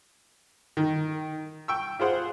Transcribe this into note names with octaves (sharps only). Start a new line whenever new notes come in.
D#3
G5 C#6 E6
F4 G#4 C5 F#5